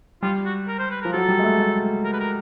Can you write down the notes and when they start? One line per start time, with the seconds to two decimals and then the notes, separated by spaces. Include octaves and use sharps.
0.22 G3 F4
0.45 F#4
0.68 A#4
0.79 C5
0.91 B4
1.02 F3 A#4
1.13 F#3 A4
1.28 G3
1.39 G#3
1.44 A3
1.59 A3
2.04 A#4
2.13 B4
2.20 A#4